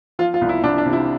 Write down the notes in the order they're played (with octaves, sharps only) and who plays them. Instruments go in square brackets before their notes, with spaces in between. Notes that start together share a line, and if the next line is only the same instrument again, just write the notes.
[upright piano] F3 F4
F4
C2
E4
C2 D4
D4
C3
E4